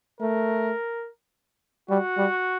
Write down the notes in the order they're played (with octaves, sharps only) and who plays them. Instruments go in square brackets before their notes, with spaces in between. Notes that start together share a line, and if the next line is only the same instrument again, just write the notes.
[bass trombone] A3 [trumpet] A#4
[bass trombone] G3 [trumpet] F#4
[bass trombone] G3